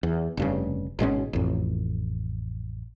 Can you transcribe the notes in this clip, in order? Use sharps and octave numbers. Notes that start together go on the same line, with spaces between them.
E2
F1 G2 C#3
G#1 B2 G#3 C#4
A1 F2